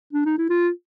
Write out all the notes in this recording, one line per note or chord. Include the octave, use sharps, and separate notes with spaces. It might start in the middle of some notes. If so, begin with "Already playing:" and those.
D4
D#4
E4
F4